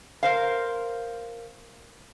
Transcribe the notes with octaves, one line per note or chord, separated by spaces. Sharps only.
A#4 C5 F5